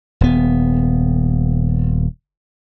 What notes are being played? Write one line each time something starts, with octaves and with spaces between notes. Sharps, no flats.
D#1 B3